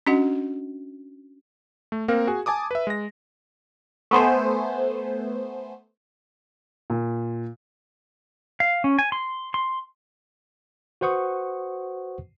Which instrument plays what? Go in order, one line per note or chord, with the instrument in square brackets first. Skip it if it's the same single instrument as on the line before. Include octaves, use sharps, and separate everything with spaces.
[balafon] C#4 D4 F#4 D#5 F#5
[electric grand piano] A3
A#3 C4 A#4 F5
F#4 G#4 G#5
G#5 A5 D6 D#6
B4 E5
G#3 A#6
[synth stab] A3 B3 C5 G#5
[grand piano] A#2
[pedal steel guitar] F5
C#4
G#5
C6
C6
[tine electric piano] F#4 B4 C5 F#5 C#6 D#6